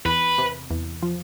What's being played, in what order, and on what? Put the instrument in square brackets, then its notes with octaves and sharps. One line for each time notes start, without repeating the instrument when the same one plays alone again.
[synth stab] E2 [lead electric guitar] B4
[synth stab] C3
E2
F3